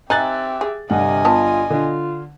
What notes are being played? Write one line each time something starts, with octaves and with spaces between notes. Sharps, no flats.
C4 D#4 G4 E5 G#5 F#6 A6
G#4
G1 G2 C3 D#5 F#5 G#5
B3 F4 A5
D3 F4